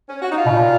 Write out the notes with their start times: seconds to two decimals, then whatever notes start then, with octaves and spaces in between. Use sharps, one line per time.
0.09 C#4
0.22 F#4
0.31 D#4
0.37 F4
0.46 B2
0.51 A#2